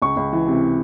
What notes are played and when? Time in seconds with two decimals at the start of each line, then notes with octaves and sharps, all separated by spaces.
0.02 C#2 C#6
0.17 C#2
0.33 E3
0.47 C3